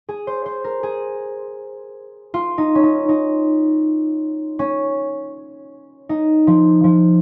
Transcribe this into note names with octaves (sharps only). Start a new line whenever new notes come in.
G#4
C5
C5
A#4
G#4
F4
D#4
C#4
D#4
D#4
C#4
D#4
F3
F3